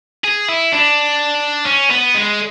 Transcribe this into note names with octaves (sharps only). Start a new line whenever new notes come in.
G#4
E4
D4
C#4
B3
G#3